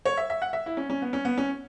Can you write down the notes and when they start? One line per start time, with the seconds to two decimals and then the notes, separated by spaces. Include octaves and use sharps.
0.05 C#5
0.17 E5
0.30 E5
0.42 F#5
0.53 E5
0.66 E4
0.77 C#4
0.90 C#4
1.02 B3
1.13 C#4
1.25 B3
1.38 C#4